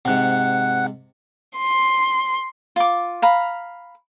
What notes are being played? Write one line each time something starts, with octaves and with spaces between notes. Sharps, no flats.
G#2 C3 F#5 F#6
C6
F4 D6
F5 A#5 B5